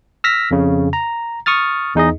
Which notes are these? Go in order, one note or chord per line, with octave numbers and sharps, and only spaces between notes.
E6 F6 A#6 B6
F2 C#3
A#5
C#6 D#6 F6 A6
E2 D#4 G#4 D#5